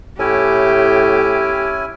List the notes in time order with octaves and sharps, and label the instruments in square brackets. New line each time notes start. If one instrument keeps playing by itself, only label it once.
[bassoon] A2 [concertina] C#4 E4 G#5 [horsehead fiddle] G4